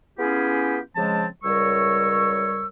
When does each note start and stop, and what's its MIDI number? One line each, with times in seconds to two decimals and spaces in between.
0.19 0.80 59
0.19 0.80 61
0.19 0.80 64
0.19 0.80 65
0.19 0.80 67
0.19 0.80 68
0.96 1.26 49
0.96 1.26 53
0.96 1.26 56
0.96 1.26 60
0.96 1.26 81
1.44 2.67 37
1.44 2.67 55
1.44 2.67 70
1.44 2.67 73
1.44 2.67 85
1.44 2.67 88